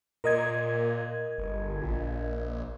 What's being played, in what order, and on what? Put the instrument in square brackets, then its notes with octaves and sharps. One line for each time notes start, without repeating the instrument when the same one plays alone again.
[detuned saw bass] A#2 [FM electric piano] A#4 D#5 G#6
[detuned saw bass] G1
A#1